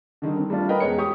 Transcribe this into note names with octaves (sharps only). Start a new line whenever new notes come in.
D3 D#3 G3 D#4
C4
G3 A3 D4 F4
A#4 B4 D#5 G5 B5
E2 G#3 C#5 C#7
G4 C#6 D#6